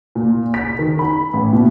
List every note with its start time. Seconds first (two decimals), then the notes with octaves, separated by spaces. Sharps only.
0.15 A#2
0.54 B6
0.79 D#3
0.99 B5
1.33 A1
1.53 B2